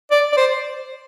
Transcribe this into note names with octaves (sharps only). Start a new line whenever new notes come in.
D5
D5
C5